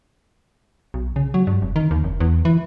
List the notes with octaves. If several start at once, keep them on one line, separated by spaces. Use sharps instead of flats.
B1
C#3
F#3
G2
F1
D#3
D#2
F1
E2
E3